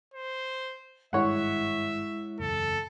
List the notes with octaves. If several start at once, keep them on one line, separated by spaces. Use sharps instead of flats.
C5
G#1 G2 G#3 E4 C#5 E5 F#5
F#1 B1 E2 A4